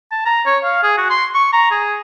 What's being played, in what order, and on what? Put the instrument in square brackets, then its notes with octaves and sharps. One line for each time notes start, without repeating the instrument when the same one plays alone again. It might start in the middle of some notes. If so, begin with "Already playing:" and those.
[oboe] A5
A#5
C#5
F5
G#4
F#4
C6
C#6
A#5
G#4